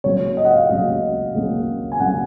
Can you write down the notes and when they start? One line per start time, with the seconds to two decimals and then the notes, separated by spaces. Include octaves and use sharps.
0.04 C#3 F#3 A#3 C#4 C#5
0.37 D#5
0.45 F#5
0.53 F5
0.69 C#3 F#3 A#3 C#4 D#5
1.34 C#3 F#3 A#3 C#4
1.92 G#5
2.00 C#3 F#3 A#3 C#4 F#5